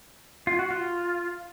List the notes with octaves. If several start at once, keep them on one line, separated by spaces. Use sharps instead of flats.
F4
F#4
F4